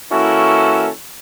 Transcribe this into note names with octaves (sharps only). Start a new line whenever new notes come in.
E3 A#3 C#4 E4 F#4 A4